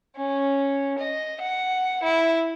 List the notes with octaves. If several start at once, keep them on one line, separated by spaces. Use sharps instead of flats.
C#4
D#5
F#5
E4